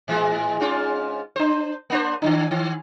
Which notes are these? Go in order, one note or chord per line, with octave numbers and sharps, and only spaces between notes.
A2 E3 G#3
G#2 C#4 F4
D4 C5
A#3 D4 C5
D#3 F3 D4
D#3